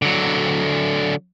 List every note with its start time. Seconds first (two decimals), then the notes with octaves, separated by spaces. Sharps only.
0.02 D3 F#3